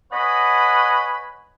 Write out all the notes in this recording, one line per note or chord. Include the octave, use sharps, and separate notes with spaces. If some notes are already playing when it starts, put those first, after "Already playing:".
B4 C#5 D#5 F#5 G#5 B5